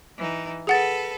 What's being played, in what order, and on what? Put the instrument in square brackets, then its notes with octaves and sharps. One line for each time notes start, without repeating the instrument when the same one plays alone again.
[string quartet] E3 D#4
[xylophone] G#4 F#5 A6 [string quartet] A4 B4